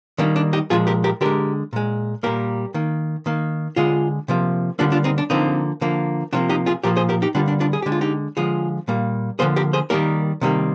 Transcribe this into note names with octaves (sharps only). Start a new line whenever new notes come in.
D#3 G3 A#3 D4
D4
D#4 G4
A#2 F3 G#3 F4 G#4
G4 A#4
G4 A#4
D3 G#3 G4 A#4
A#2 G#3
A#2 G3 A#3 G4 A#4
D#3 A#3
D#3 A#3
D3 G#3 F4 G#4
C3 F3 A#3
D3 G3 A#3 D4 F4
D4 F4
C4 D#4
D4
D3 F3 A#3 C4 D#4
D3 F3 A#3
C3 F3 A#3 D4 F4
D#4 G4
F4 G#4
A#2 F3 A#3 G4 A#4
G#4 C5
G4 A#4
D#4 G4
D3 G3 A#3 D4 F4
D4
D4 F4
G#4
D3 G#3 G4
F4
D#4 G4
D3 F3 G#3 F4 G#4
A#2 G3 A#3
D3 F3 A#3 G#4 C5
G4 A#4
G#4 C5
D#3 G3 A#3 G4 A#4
C3 D#3 G3 A#3